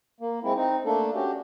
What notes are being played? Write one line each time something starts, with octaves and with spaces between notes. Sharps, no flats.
A#3
G#3 C4 E4
C4 D#4
A3 A#3 D4 A4
C#4 D4 F#4 G4